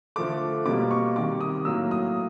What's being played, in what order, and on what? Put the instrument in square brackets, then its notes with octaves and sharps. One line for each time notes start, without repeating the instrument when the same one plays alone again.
[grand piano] D3 F3 A3 D6
B2 G3 A#3 D6
C#6
C3 D#3 G3 D6
D#6
A2 F#3 A#3 E6
D#6